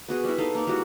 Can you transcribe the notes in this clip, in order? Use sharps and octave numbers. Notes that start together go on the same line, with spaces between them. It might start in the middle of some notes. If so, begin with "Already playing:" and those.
B3 F#4 G#4
G3 E4
D#4 G#4 A4 F5
A#3 D#4
G3 G#3 E4 F#4